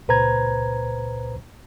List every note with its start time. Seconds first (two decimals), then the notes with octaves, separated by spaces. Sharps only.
0.08 C#2 A#2 B4 C5 A#5 G#6